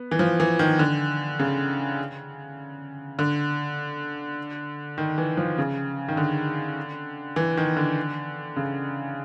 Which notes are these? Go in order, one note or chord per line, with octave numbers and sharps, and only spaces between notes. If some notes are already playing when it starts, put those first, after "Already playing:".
Already playing: B3
E3
F3
E3
D#3
D3
C#3
D3
D#3
E3
F3
C#3
D#3
D3
E3
D#3
D3
C#3